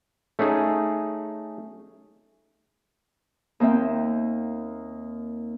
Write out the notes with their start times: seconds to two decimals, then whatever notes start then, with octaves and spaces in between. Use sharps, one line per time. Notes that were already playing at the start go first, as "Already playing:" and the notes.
0.39 A3 C#4 D#4 G#4
3.60 D#2 A#3 C4 E5 G5